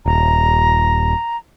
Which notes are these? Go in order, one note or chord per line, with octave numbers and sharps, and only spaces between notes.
D#1 A#5